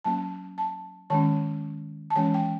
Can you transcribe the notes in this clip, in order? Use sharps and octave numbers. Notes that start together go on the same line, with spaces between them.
F#3 A#3 C#4 A5
A5
D#3 G#3 C#4 A5
A5
E3 G#3 C#4 G#5
G5